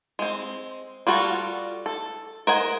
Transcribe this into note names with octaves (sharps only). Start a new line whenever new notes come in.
G#3 C4
G3 F4 F#4 A4
A4
A#4 C5 D#5 F#5 G#5